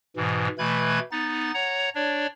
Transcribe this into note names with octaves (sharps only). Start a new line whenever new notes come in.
G#2 B2 E3
B2 E3 A3 B4 B5 G#6
B3 D#4 A6
C#5 F#5 A#5
D4 C#5 D5